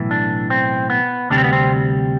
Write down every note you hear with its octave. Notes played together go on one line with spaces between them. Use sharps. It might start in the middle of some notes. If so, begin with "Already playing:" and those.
Already playing: B1 A2 E3
D4
C4
B3
D2 C3 G3 D4
C4
B3
C4